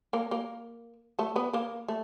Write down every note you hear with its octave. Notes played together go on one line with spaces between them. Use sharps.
A#3 A#4
A#3 A#4
A3 A4
B3 B4
A#3 A#4
A3